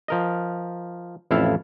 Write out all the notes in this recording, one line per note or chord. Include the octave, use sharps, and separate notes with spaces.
F3 A#4 D#5
A1 F2 E4 A4 F5 A5